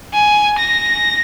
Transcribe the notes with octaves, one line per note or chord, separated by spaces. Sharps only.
G#5
A#6